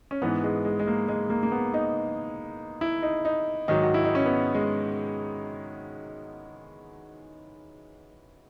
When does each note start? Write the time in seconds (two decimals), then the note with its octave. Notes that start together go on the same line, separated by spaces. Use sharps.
0.11 C#4
0.22 G#2 E3 B3
0.44 G#3
0.65 G#3
0.79 G#3
0.87 A#3
1.09 G#3
1.30 A#3
1.43 A#3
1.52 B3
1.74 D#4
2.81 E4
3.03 D#4
3.25 D#4
3.68 G#2 D#3 F#3 D#4
3.83 F#4
3.94 E4
4.05 D#4
4.15 C#4
4.26 B3
4.55 G#3